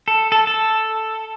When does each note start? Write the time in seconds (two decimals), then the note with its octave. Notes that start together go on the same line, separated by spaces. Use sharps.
0.08 A4
0.32 A4
0.47 A4